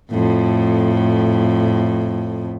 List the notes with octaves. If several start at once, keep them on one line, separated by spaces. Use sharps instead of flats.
F2 A2